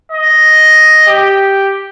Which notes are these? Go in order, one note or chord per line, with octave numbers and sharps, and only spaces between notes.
D#5
G4